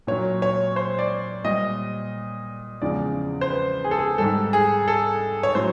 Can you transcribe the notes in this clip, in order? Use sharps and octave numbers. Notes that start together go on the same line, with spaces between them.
A#2 F#3 C#5
C#5
C5
D5
A#2 G3 D#5
E2 C#3 F3 G#3 D5
C5
B4
G#4
A4
G#4
G#2 D#3 G3 A4
G#4
A4
C#5
A2 F#3 C5